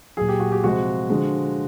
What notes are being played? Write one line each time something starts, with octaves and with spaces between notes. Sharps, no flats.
A#2 F#3 G#4
G4
F#4
G4
C3 F3 G#3 F#4
D3 F3 G#3